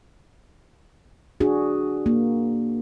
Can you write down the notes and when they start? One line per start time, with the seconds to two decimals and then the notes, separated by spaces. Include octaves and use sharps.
1.40 D4 F#4 G#4
2.06 A#3